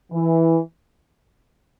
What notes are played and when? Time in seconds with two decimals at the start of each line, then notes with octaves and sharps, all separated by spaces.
0.12 E3